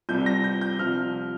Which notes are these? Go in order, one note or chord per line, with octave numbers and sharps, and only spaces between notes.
C2 C3 G3 G6
A#6
G6
G6
C2 C3 F3 F6